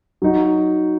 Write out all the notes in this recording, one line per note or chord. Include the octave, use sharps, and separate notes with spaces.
F#3 D#4 F#4